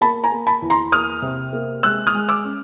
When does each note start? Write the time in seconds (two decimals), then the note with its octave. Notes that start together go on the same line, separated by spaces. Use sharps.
0.01 A#3 A5 B5
0.24 G#5 A#5
0.32 A#3
0.47 A5 B5
0.62 E2
0.70 A#5 C6
0.92 A#3 D#6 F6
1.22 C3
1.53 A#3
1.83 G#3 E6 F#6
2.07 D#6 F6
2.14 G#3
2.29 D6 E6
2.44 C#4